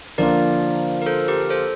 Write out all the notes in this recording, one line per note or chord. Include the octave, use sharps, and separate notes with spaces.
D3 F3 A#3 D4 F4 A#4 D5
A#4
A4 C5
G4 A#4
A4 C5